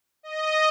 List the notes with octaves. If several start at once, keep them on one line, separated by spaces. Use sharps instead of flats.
D#5